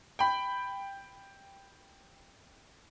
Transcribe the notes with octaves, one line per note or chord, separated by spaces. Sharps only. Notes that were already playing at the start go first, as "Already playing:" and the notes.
G5 B5